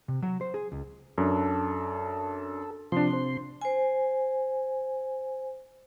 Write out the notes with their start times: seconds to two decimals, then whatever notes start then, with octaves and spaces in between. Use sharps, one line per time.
0.08 C3
0.22 F#3
0.41 C5
0.54 G#4
0.72 C#2
1.18 F#2 D4 A4
2.92 C3 F3 D4 C6
3.13 C5
3.61 C5 G#5